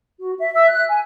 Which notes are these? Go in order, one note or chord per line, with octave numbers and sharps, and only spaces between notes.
F#4
E5
E5 E6
F#6
G#5